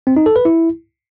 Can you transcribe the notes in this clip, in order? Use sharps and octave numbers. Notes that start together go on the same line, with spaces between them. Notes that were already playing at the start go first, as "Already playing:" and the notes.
C4
D#4
A4
B4
E4